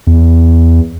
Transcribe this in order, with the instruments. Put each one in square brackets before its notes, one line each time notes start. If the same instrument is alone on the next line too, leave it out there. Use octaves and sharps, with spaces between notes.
[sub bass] E2